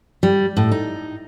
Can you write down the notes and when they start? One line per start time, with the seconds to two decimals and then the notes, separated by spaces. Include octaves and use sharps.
0.23 G3
0.57 A2
0.72 D#4